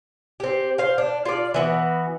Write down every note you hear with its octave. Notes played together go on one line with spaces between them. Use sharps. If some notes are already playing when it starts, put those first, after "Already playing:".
C4 G4
C5 F5
D4
F4 D5
E3 B3 F#4